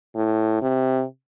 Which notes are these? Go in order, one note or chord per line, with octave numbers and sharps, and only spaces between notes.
A2
C3